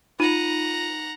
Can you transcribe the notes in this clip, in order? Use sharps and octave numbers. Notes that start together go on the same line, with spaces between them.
D#4 F4 F#5 A#5 B5 D#7